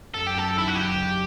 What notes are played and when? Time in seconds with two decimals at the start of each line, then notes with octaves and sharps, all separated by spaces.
0.14 F#2 A4
0.27 G4
0.35 F#2 A4
0.55 D#3 E4
0.68 F#4
0.75 F#1 G4
0.95 F#1